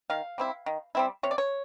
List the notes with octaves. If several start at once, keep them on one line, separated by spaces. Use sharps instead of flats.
D#3 F5
G3 C4 E4
D#3
G3 C4 E4
C3 C#5
D5
C#5